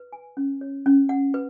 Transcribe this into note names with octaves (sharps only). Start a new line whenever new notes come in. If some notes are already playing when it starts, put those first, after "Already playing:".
Already playing: B4
G#5
C#4
C#5
C#4
F#5
B4